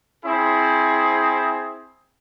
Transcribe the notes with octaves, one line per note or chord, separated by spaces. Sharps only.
C4 E4 G#4